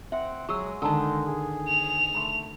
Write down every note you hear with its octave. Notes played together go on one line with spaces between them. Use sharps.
C4 E5 F#5
F#3 G#3 C#6 E6
D3 D#3 G#3 A5 A#5 E6
G#4
F7
A3 B5 C6